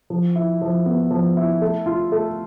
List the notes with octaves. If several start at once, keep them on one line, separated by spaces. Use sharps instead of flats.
F3
E4
F3
B3
F3
E4
A3
F4
A3